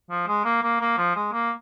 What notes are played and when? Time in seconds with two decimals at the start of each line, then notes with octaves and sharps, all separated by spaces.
0.10 F3
0.27 G#3
0.45 A#3
0.63 A#3
0.81 A#3
0.98 F3
1.16 G#3
1.33 A#3